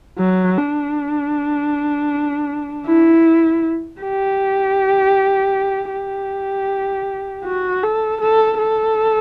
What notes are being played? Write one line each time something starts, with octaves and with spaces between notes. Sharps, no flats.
F#3
D4
E4
G4
G4
F#4
A4
A4
A4